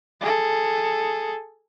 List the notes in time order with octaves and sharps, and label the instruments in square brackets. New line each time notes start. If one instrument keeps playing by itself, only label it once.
[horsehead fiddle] G#4 A4